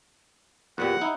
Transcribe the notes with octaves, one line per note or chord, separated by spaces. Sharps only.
E2 A#2 G3 F#5
D#4 E4